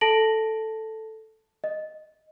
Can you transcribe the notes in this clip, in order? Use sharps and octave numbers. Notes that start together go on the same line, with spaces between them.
A4 A5 A#6 D7 F#7
D#5